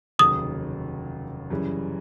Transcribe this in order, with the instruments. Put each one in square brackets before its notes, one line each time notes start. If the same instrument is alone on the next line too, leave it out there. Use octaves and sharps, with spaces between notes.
[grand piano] F1 D#2 C#3 F#3 [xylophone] D#6
[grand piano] F#2 C#3 E3 G3